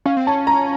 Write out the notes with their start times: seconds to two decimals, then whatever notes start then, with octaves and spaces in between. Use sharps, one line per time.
0.06 C#4 F5
0.17 C4
0.27 C#4 A5
0.47 A#5